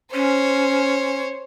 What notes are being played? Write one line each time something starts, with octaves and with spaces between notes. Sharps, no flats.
C#4 C5 C#5